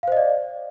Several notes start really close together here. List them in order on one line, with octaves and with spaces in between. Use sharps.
F5 C5 D#5 D5